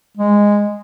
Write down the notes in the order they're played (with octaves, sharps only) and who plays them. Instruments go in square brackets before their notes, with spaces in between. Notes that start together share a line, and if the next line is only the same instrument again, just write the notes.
[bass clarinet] G#3